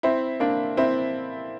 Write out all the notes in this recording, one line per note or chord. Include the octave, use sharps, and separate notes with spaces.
C4 E4
A#3 D4
C4 E4